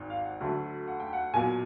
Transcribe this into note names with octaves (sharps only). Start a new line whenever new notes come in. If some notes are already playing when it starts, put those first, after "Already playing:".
Already playing: G#1 G#2
F5
F#5
D2 D3 F#3 A3
F#5
G5
F#5
B1 A#2 F#3 G#5